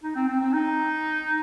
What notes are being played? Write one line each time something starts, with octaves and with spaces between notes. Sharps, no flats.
D#4
C4
C4
C4
D#4